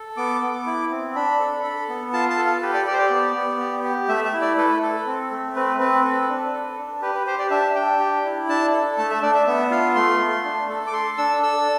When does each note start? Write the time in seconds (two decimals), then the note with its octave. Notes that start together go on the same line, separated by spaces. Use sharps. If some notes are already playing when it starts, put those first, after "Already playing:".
Already playing: A4
0.17 B3 D6
0.42 B3
0.66 E4
0.91 C4
1.15 D4 B5
1.40 A4
1.64 A4
1.89 B3
2.13 F4 A5
2.30 A5
2.38 A4
2.46 F5
2.62 G4 B4
2.74 D5
2.87 G4 D5
2.93 C5
2.98 D5
3.10 B3
3.36 B3
3.60 G4
3.84 G4
4.09 A3 E5
4.25 E5
4.33 E4
4.41 D5
4.58 A4 B4
4.82 A4
5.06 C4
5.31 A3
5.55 C4 B4
5.80 C4 B4
6.04 A4
6.29 D4
6.53 A4
6.78 D4
7.02 G4 B4
7.14 B4
7.26 G4 C5
7.39 D5
7.51 D4 E5
7.75 D4 G5
8.00 G4
8.25 E4
8.49 D4 A5
8.73 A4
8.98 A3 A5
9.11 E5
9.22 D4 D5
9.34 E5
9.47 B3 E5
9.71 F4 F5
9.95 A3 C6
10.20 A3
10.44 D4
10.69 A4
10.87 D6
10.93 A4 C6
11.18 D4 E6
11.43 A4 E6